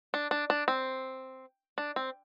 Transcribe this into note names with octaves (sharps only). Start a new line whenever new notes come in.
D4
D4
D4
C4
D4
C4